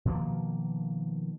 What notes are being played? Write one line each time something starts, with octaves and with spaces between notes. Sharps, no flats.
B2 D#3 F3 A#3